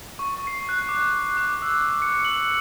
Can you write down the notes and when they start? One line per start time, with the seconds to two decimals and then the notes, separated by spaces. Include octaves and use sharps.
0.19 C#6
0.47 C7
0.69 F#6
0.89 D6
1.37 D6
1.62 E6
2.02 C#7
2.25 F#7